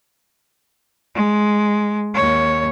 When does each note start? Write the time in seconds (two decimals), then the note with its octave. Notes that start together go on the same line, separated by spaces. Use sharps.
1.15 G#3
2.14 D#2 C#5